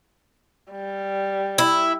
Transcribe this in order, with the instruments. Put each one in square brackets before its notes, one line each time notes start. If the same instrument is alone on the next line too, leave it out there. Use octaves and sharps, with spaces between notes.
[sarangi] G3
[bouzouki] E4